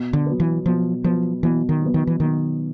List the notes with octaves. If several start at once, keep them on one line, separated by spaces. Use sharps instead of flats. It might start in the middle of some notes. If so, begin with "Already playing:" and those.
Already playing: B2
D3
F#3 B3
E3
B2 F3
F3 F#3 B3
B2 E3
D#3
F#3 B3
D#3
E3
B2 D#3